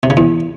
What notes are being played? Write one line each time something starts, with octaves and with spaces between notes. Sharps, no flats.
C3
C#3
E2